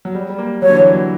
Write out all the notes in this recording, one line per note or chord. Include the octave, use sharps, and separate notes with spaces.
F#3
G3
G3
A#3
F#3 C#5
D3
E3
F#3